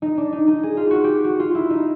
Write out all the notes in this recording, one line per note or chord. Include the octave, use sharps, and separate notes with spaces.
D#4
D4
D#4
D#4
G#4
F4
F#4
G4
F#4
F4
E4
D#4